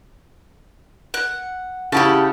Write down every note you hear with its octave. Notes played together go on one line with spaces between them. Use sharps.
F#5
C#3 E4 G4 F#5 A5